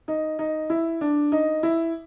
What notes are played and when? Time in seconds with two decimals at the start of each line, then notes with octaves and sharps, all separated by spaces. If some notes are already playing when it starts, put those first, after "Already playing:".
0.08 D#4
0.39 D#4
0.70 E4
1.01 D4
1.32 D#4
1.63 E4